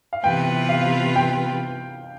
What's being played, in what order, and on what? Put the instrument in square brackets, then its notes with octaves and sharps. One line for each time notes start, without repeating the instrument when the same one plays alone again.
[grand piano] F5
[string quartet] C3 E3 B3 F4 B4 [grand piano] G5
[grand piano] F5
G5